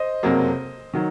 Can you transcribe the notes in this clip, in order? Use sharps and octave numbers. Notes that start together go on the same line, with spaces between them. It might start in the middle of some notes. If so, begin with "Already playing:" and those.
Already playing: C5 D#5
F#1 F2 C3 F#3 A#3
D#3 F#3